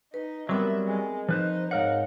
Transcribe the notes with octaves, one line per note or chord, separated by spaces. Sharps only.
D#4 B4
F#3 G3 B3 C4 A#4 E5
G#3
F3 D#4 B4 C5
G#2 D#4 A#4 C#5 F5 F#5